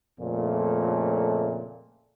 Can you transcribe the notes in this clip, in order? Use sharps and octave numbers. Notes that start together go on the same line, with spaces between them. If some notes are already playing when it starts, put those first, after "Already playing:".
F2 A#2 C#3 A3